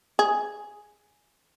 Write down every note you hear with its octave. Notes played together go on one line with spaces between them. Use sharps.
G#4